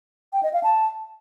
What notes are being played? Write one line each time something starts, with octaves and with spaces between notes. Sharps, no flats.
G5
D#5
F5
A5